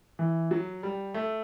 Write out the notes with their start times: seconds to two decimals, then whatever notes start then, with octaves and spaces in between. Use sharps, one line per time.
0.19 E3
0.51 F#3
0.83 G3
1.14 A3